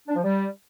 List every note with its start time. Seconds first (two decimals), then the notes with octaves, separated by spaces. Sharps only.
0.08 D4
0.16 F3
0.24 G3